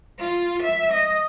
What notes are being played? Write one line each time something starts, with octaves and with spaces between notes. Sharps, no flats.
F4
E5
D#5